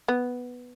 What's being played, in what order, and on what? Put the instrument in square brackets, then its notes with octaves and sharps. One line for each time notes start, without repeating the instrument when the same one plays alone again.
[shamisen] B3